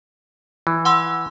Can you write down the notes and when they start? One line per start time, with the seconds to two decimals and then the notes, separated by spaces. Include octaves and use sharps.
0.67 E3
0.85 F#5 C6 E6